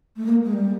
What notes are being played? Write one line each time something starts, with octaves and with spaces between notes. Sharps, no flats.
A3
A#3
G#3
G3